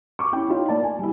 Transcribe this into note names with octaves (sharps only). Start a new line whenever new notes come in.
C#6 D6
C#4 E4 G5
D#4 F4 C#5
A#3 D5 A5
G#5
G3 E4